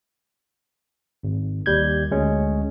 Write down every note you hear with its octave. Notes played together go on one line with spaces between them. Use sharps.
G#1
D#2 G3 G6 G#6
D2 G#3 C#4